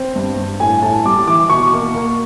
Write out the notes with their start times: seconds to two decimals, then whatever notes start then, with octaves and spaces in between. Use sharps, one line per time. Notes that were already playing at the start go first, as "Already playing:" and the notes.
Already playing: C4
0.16 G2
0.37 G2
0.60 A2 G#5
0.82 A2 A5
1.05 G3 D6
1.27 E3 D6
1.49 B2 C#6
1.73 A#3
1.94 A#3